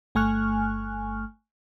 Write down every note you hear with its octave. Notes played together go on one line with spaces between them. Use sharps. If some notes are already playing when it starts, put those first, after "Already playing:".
G1 A3 G#5 C#6 F6 F#6